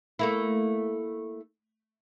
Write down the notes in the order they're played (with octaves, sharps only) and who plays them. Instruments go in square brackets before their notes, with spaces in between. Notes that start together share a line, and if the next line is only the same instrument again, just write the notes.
[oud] A3 A#3 E4